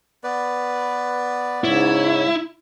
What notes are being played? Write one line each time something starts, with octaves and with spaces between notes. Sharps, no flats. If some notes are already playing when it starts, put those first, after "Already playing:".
B3 B4 D5
G#2 C#3 E4 C#5